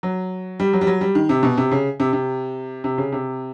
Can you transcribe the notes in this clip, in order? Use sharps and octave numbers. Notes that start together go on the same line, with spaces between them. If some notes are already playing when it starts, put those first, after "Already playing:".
F#3
G3
F#3
G3
F#3
G3
D#3
C3
B2
C3
C#3
C3
C3
C3
C#3
C3